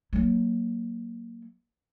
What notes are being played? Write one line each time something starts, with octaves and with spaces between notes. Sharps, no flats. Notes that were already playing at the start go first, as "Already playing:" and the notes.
F#3 A#3